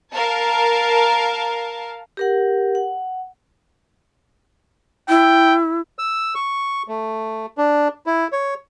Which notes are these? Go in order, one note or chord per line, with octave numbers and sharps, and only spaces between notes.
A#4 F5 A5
G4 A#4 F#5
F#5
E4 G5
E6
C#6
A3
D4
E4
C#5